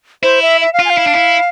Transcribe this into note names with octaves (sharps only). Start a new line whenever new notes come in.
E4 C5
E5
E5
F5
F4
G#5
F5
E4
D4
E4